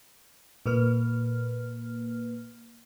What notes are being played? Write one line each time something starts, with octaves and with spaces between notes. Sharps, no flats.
A#2 A#3 B4 F6